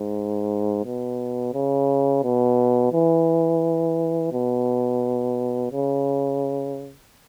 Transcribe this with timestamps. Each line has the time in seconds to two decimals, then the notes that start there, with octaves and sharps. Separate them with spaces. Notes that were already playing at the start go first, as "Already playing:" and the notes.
Already playing: G#2
0.85 B2
1.54 C#3
2.24 B2
2.93 E3
4.33 B2
5.72 C#3